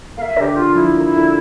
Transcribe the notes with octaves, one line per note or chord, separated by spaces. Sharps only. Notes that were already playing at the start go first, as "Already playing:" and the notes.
A#3 E5 F5
D3 G4 A#4
D3 F4
F3 E4
A#3
E4
D3